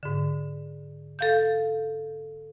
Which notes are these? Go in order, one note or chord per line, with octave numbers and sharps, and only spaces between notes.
G#2 D3
A4 F5 G6